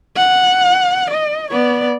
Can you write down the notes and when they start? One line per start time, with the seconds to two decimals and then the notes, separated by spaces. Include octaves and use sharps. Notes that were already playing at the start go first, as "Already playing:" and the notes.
0.16 F#5
1.10 D#5
1.50 B3 D5